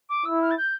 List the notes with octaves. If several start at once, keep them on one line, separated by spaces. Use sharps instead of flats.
D6
E4 E6
F6
A6
G6